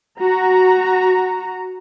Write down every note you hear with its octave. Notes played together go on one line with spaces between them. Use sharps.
F#4 A#5